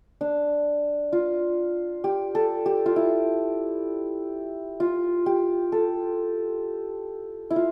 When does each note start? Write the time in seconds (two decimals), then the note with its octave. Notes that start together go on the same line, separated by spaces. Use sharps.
0.21 D4
1.13 F4
2.04 G4
2.35 A4
2.66 G4
2.86 F4
2.96 E4
4.80 F4
5.26 G4
5.72 A4
7.51 E4
7.56 F4